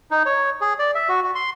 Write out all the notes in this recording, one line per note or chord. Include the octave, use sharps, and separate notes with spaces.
D#4
C#5
G#4
D5
E5
F#4
F#4
C6